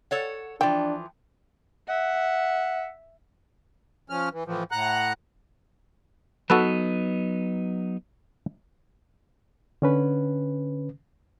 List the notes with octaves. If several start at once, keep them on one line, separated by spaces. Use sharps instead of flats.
A4 C#5 F#5
E3 F3 D4 G5
E5 F#5
F3 C#4 F6
E3
A2 E3 F3
A2 F#5 A#5 F#6
F#3 B3 D#4 F#4 A4 B4
D3 C#4 B4